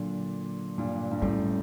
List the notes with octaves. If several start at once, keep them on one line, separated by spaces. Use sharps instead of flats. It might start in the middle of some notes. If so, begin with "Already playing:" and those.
Already playing: A#2 D3 F#3
G2 A#2
G2
F#2 A2 G3